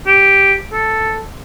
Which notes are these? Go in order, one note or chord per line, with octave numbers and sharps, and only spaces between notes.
G4
A4